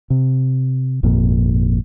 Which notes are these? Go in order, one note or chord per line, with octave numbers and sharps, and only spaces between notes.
C3
G#1 F2 A#2